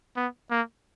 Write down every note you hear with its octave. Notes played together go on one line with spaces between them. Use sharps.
B3
A#3